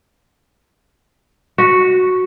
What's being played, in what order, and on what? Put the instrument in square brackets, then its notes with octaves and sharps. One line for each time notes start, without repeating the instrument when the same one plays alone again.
[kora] F#4